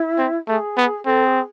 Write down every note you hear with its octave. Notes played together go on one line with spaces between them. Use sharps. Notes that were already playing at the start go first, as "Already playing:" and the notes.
Already playing: E4
C4
A3 G#4
B3
C4 A4
G#4